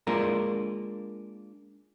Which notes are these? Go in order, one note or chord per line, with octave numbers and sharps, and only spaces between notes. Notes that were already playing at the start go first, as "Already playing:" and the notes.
G#3 A#3 D4 F4 A#4